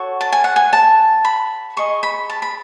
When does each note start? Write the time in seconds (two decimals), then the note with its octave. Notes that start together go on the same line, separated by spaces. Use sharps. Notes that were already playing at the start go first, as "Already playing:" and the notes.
Already playing: F#4 A4 C#5
0.21 A5
0.32 G#5
0.44 F#5
0.56 G#5
0.73 A5
1.25 B5
1.77 G#4 D#5 C#6
2.03 B5
2.30 A5
2.42 B5